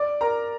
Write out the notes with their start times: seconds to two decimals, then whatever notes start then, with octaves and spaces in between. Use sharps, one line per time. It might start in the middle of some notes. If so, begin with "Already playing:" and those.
Already playing: D5 D6
0.21 A#4 A#5